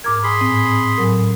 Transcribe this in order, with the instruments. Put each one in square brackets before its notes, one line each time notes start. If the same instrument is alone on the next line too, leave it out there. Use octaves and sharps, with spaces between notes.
[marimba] G#2 D6 G#6 [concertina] A#4
[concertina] G#4 B5 C6
[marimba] A2 C4
A2 F#3 A#4